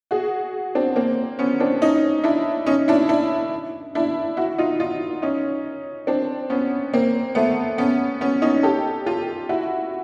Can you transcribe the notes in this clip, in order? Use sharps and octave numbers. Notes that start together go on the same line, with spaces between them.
F#4 G#4
C4 D4
A#3 C4
B3 C#4
C4 D4
C#4 D#4
D4 E4
C#4 D#4
D4 E4
D4 E4
D4 E4
E4 F#4
D#4 F4
D#4 F4
C#4 D#4
C4 D4
B3 C#4
A#3 C4
A3 B3
B3 C#4
B3 C#4
C#4 D#4
G4 A4
F4 G4
E4 F#4